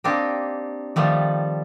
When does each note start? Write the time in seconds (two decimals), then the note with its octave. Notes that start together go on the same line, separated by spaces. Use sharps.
0.04 A#3 C4 D4 D#4 G4
0.96 D#3 F3 G3 A3